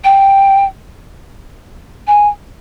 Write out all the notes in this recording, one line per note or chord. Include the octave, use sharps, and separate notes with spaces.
G5
G#5